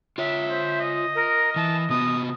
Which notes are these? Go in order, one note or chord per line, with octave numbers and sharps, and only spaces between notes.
F4 C#5 E5
C5
D#5
A#4
E3 A5
C3 B3 D#6